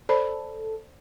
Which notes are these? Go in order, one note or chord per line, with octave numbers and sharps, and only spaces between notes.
A4 C5 D5 B5